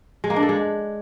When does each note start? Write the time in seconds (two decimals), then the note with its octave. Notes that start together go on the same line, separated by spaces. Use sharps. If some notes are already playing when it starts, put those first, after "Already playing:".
0.24 G#3
0.30 A#3
0.36 D4
0.43 A4
0.49 G#3